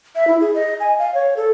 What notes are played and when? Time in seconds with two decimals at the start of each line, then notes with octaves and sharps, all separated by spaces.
0.16 E5
0.27 E4
0.41 G#4
0.55 D#5
0.80 G#5
0.99 F5
1.14 C#5
1.37 A4